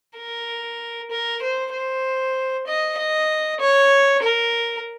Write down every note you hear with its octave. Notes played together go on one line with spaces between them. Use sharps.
A#4
A#4
C5
C5
D#5
D#5
C#5
A#4